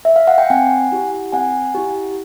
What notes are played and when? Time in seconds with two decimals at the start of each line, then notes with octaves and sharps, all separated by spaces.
0.05 E5
0.16 F5
0.28 F#5
0.38 G5
0.50 C4 F#5 G#5
0.92 E4 G4
1.32 C4 F#5 G#5
1.75 E4 G4